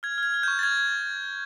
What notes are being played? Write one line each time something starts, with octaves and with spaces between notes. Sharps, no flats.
F6 G#6
F6 G#6
F6
G6
C#6
A6
F6 G#6